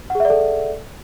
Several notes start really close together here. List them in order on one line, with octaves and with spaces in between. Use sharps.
F#5 G#4 E5 D5 A4